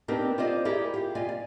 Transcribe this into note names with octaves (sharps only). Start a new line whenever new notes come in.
B3 C4 D4 D#4 G4 A#4
F4 C5 D5 D#5
E4 G4 G#4 A#4 D5
F4 G4
F4 D5 D#5 G#5
D5